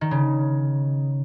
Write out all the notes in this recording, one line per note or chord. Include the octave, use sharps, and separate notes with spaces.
D#3
C#3